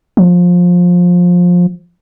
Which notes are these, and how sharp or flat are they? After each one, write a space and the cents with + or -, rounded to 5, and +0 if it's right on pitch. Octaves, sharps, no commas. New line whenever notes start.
F3 +20